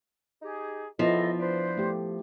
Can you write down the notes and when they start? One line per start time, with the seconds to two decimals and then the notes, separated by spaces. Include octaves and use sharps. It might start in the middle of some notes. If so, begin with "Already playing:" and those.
0.42 D#4 G4 G#4
0.99 C#3 F3 B3 E4 A4 D#5
1.39 D4 B4 C5
1.77 A3 G4